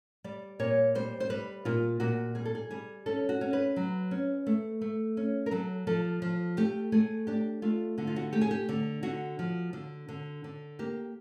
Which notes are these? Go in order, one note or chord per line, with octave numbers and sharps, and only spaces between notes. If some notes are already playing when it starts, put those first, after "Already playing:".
G3 D5
A#2 C#5
G3 C5
C5
G3 B4
A#2 F4
A#2 F#4
G3 G#4
A4
G#4
G3 G#4
C#4 A4
F#4
C#4
B4
F#3
C#4
A3
A3
C#4
A#4
F#3 A4
F3 A4
F3
A3 G4
A3 G#4
D4 G4
A3 F4
D3 F#4
F4
F#4
A3 G4
G#4
G4
D3
D3 F#4
F3
D3
D3
D3
A#3 G4